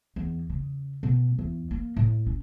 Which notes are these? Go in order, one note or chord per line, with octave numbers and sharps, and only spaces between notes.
E2
C#3
B2
E2
A#3
A2
C#4